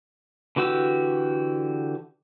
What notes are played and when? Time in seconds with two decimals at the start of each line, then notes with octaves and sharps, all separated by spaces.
0.56 D3 E3 F#4 G4 E6